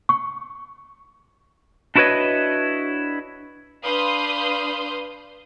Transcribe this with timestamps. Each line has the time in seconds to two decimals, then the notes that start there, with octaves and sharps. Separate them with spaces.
0.09 C#6
1.96 D4 E4 F#4 B4 C#5 D#5
3.85 D4 B4 F5 C6 D#6 G6